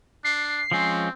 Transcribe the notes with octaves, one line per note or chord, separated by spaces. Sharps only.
D4 C7
F3 G#3 C4 C#4